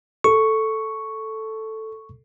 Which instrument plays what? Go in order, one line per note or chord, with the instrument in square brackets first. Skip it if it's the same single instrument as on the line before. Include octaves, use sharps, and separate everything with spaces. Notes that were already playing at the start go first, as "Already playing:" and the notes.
[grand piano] A4 [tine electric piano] C#6